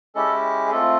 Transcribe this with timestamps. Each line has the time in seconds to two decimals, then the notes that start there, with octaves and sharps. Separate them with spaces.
0.15 G#3 C#4 E4 G4 A4
0.67 G#4
0.71 A3 C4 F4 A4